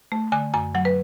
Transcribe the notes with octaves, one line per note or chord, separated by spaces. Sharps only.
A3
D3 G#5
F#2 G#5
F#3 F#5
B4